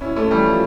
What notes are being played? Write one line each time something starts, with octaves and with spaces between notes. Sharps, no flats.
C#4 E4
A3 C#4
E3 G3
F3